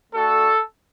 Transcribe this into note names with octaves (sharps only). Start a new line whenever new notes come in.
A3 D4 F#4 A4